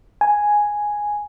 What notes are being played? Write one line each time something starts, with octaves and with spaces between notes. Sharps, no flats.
G#5